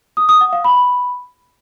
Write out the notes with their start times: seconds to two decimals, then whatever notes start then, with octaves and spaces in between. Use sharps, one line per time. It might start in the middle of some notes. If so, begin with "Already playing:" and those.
0.17 D#6
0.29 D#6
0.41 F#5
0.53 F5
0.64 B5